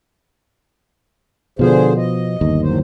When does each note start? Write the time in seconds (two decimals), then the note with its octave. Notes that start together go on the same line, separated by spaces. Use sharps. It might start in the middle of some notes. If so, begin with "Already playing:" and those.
1.59 B2 D3 F3 B3 G#4 C5
1.97 D#5
2.41 G1 D#2
2.61 A2 F#3 C5